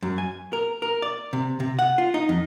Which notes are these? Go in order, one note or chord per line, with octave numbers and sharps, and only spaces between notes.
F#2
G#5
A#4
A#4
D5
C3
C3
F#5
F4
D#4
F2